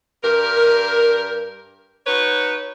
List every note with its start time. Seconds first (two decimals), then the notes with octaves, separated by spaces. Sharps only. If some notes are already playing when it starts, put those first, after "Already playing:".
0.23 G2 G4 A#4
2.07 D#4 F#4 B4 C#5